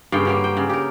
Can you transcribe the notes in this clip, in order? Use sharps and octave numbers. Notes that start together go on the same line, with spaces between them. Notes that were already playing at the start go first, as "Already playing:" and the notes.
G2 C#3 A#3 G5
D3 G3 A#3
G5
C#3
G4 A#4